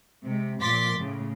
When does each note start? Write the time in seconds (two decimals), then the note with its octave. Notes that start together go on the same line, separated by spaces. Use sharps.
0.23 C3 G#3
0.61 A#2 F3 C6 D6 A6 B6
0.97 A2 C#3